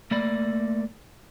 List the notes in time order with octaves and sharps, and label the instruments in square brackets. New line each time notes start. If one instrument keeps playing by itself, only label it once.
[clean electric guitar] A3 A#3 D5 B5